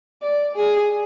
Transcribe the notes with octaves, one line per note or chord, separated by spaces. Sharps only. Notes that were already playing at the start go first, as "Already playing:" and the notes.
D5
G#4